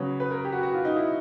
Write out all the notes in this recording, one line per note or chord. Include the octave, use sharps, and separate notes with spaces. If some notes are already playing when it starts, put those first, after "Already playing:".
Already playing: C#3 F#3 B3 C#5
B4
A#4
G4
F#4
F#4
F4
D#4
E4